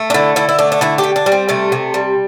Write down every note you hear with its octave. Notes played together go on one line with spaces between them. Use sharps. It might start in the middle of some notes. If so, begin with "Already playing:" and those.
Already playing: A3
D4
D3 E4
D3 E4
E4
A3 D4
D4
D3 E4
G4
D3
D4
G3
C4
C3 A3
C3
G3